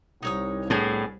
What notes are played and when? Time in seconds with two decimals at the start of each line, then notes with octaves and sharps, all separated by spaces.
0.23 C2 D#4 C#5 D#6
0.70 A2 B3 D4 G#4